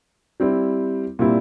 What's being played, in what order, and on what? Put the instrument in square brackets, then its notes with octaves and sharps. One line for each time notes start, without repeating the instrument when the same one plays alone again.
[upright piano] G3 C4 E4
A#2 G3 C4 E4